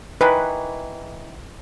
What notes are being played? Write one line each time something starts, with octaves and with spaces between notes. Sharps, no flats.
D#3 E3 B4